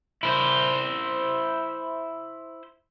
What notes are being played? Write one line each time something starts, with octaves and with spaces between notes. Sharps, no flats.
E4 C5